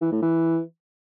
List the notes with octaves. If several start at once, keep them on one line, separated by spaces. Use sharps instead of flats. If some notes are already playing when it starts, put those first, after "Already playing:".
E3
A2
E3